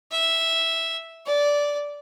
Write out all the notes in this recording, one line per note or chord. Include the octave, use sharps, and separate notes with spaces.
E5
D5